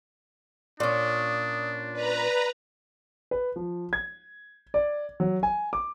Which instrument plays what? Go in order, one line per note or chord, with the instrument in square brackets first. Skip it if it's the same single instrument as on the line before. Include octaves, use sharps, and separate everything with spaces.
[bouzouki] A#2 C#4 [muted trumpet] D4 [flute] D#6
[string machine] B4 A#5 [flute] D5
[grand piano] B4
F3
G#6
D5
F#3
G#5
D6